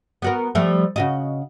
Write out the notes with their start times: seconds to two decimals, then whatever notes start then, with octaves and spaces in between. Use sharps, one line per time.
0.22 B3 F#4 A#4
0.55 F3 G3 A3
0.96 C#3 F#4 D#5